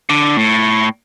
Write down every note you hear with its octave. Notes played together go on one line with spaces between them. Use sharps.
D3
A2